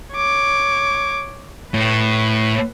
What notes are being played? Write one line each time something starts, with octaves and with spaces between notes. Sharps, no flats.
C#5 D6
A2 B4